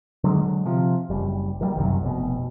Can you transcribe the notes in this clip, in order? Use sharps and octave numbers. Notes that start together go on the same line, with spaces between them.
D3 F#3 G#3
C3 F3
F#1 G3
D#3 F3 G3
F#1 C2 F#2
F1 B2